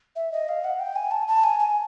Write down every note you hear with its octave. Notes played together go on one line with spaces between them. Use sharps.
E5
D#5
F5
F#5
G5
G#5
A5
A5
G#5
G#5